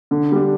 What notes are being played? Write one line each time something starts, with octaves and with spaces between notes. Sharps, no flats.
D3
G3 D4